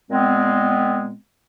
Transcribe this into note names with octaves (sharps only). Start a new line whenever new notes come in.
A#2 G#3 B3 C4